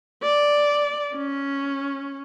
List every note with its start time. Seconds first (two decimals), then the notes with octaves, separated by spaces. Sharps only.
0.23 D5
1.16 C#4